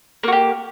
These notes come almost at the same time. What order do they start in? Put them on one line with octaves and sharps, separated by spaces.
A#3 F#4 G4